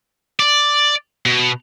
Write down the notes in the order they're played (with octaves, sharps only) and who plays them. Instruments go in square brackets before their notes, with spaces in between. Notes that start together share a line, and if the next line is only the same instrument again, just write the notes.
[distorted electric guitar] D5
B2